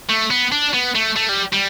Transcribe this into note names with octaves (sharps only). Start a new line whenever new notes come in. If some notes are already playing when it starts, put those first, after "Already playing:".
A3
B3
D4
B3
A3
A3
G3
G3